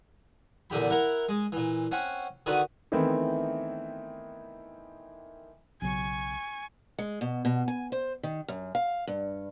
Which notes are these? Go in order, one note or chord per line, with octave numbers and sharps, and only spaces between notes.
E2 A#2 D3 G4 B5
E4 A#4 F#5 A#5
G#3
A#2 E3
C4 C#4 F#5
D3 D#3 F#4 B4
D#3 E3 A3 B3 C4 E4
B1 C#3 F#3 G#5 C#6
G#3
B2
B2
G#5
C5
D#3
F#2
F5
G2